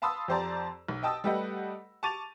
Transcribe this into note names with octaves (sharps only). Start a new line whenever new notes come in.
F5 A5 B5 C6 D#6 E6
F2 G4 C5 D5 A5 A#5
B1
D#5 G5 A5 D#6 E6
G3 A3 G4 B4 D#5 F#5
A5 C#6 D6 A6 D#7 F7